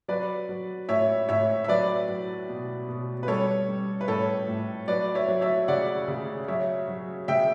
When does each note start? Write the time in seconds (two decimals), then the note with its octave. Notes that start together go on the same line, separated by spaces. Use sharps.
0.08 F#3 B4 D5
0.49 F#3
0.89 A2 C#5 E5
1.29 A2 C#5 E5
1.64 E5
1.68 F#3 B4 D5
2.08 F#3
2.49 B2
2.89 B2
3.23 B4
3.28 G3 A4 C#5
3.68 G3
4.01 B4
4.08 A2 A4 C#5
4.48 A2
4.88 F#3 B4 D5
5.15 C#5 E5
5.28 F#3
5.41 C#5 E5
5.68 C#3 D5 F#5
6.08 C#3
6.48 F#3 C#5 E5
6.88 F#3
7.28 C#3 E5 G5